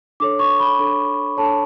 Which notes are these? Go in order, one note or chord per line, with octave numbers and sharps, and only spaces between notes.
D4 A4 C#5 D6
C#6
B5
D4 A4 C#5
D4 A4 C#5 A5